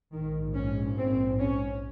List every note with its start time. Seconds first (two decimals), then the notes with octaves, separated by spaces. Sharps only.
0.12 A#1 G#2 D#3
0.55 C#4
0.97 C4
1.40 C#4